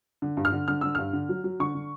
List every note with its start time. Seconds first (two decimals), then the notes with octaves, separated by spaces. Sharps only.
0.22 D3
0.37 G2
0.45 F6
0.52 D3
0.68 D3 F6
0.81 D3 E6
0.95 G2 F6
1.13 D3
1.29 F#3
1.44 F#3
1.60 D3 C#6
1.75 D3